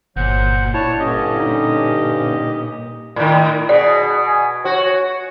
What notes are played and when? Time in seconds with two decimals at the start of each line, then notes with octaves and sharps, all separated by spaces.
0.16 G1 A#2 F#3 C5 F#5
0.74 D4 E4 C#5 A5
1.00 G2 D3 C#4 G4 D#5
1.40 D#4
3.16 A2 D#3 D5
3.69 B2 G#4 D5
4.27 G#5
4.65 F#4 C#5